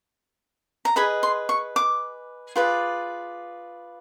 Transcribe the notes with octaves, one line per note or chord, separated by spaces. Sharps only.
A#5
G#4 B4 D#5 B5
C6
C#6
D6
F4 G#4 B4 D5